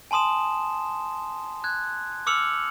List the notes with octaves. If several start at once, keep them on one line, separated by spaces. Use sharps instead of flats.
G#5 A5 C6 D#6 E7
F#6 G#6
D6 E6 F6 C#7 F7 F#7